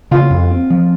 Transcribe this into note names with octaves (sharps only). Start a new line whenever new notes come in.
C#3 F4
F2
C4
F3